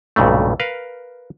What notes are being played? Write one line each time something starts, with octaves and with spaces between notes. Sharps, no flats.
B1 G2 A#2 C#3 A3
A#4 B4 F5